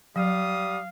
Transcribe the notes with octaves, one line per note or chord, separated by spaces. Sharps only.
F#3 G3 F5 D#6